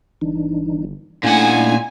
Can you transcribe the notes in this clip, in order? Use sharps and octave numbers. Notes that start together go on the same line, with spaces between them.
G1 E3 D4 D#4
A#2 A3 C#4 D4 E4 F#5 G#5